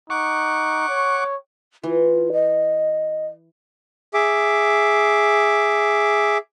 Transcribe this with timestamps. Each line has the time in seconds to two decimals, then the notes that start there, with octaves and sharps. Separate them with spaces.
0.10 D#4 F#5 C#6 D6
0.89 C#5
1.83 E3 F4
2.33 D#5
4.14 G#4 E5 D6